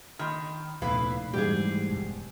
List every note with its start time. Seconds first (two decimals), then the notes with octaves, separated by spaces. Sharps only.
0.19 D#3 B5 C6 F6
0.82 F1 D2 A#2 B3 E4 B4 F5
1.33 G#2 E3 G3 A3 G4 G#4
1.90 E1